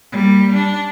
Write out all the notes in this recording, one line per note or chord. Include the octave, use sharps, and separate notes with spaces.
G3 A#3
D4